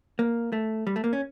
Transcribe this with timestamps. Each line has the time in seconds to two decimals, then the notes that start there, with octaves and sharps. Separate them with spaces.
0.19 A#3
0.52 A3
0.87 G3
0.96 A3
1.04 A#3
1.13 C#4